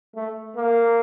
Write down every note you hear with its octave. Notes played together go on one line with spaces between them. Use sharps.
A3
A#3